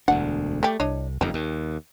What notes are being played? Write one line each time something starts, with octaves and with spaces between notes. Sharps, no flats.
E1 D2 D4 F#5
G3 A3 G4
C2 D4 C#5 D#5
F#1 F2 G3 D#4
D#2